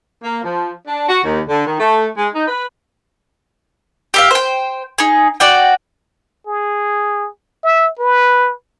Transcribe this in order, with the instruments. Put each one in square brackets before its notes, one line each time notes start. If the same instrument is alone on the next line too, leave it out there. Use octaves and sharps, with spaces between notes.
[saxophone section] A#3
F3
D4
F#4
D#2
D3
D#3
A3
G#3
D#4
B4
[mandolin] G4 E5 F5
C5 G5
D#4 G#4
F#4 D5 G5
[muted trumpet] G#4
E5
B4